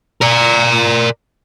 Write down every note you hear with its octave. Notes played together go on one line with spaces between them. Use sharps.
A#4 D5